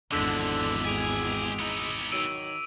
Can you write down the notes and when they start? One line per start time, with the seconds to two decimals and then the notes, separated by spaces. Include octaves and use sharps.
0.12 G#1 E2 D3 F3 G#3 D6 E6 B6
0.85 G#3 G4 G#5 B6 D7 F7
1.60 B3 D#4
2.12 D#3 F#3 E6 D7 D#7